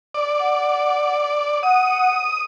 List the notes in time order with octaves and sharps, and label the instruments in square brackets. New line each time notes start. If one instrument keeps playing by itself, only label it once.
[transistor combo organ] D5
[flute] F#5
[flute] F#5 [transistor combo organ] D#6